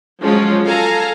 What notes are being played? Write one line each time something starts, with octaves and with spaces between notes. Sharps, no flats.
F3 F#3 G#3 C#4 F4
A4 F5 G#5 A#5